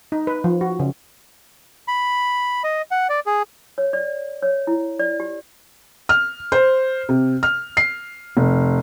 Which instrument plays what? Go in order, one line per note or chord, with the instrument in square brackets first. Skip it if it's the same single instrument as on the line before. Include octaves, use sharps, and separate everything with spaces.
[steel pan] D#4
B4
F3
F#4
C#3
[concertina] B5
D#5
F#5
D5
G#4
[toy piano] C#5
D5
C#5
E4
D5
G4
[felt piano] F6
C5
C3
F6
C7
F1